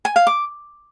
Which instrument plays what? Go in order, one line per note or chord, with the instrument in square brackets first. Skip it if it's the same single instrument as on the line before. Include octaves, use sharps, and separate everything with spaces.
[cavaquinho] G#5
F5
D6